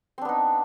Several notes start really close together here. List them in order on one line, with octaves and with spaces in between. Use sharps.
C4 D4 B3 D#4